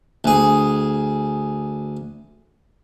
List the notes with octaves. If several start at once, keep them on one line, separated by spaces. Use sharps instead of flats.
D2 G#4